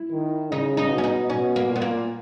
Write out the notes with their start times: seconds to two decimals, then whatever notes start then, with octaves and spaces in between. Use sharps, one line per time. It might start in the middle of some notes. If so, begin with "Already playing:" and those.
Already playing: E4
0.11 D#3
0.51 C#3 D#4
0.77 D#4
0.90 B2
0.98 C#4
1.04 D#4
1.30 B2 C#4
1.56 A#3
1.70 A#2
1.76 B3
1.82 A#3